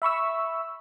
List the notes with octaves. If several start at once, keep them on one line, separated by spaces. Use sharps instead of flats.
E5 B5 C#6 E6